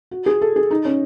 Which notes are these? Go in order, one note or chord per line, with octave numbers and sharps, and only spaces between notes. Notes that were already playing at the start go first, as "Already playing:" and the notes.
F#4
G#4
A4
G#4
D#4
C#4